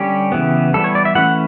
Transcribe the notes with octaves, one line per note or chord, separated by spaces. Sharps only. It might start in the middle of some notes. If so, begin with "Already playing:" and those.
Already playing: D3 G3 C#4 G4
C#3 E3 B3
E3 G3 B3 A4
C#5
D5
E5
E3 A3 C#4 F#5